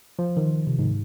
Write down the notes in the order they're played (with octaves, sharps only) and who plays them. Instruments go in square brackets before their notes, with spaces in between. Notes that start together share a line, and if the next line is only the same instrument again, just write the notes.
[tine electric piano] F3
D#3
C3
G#2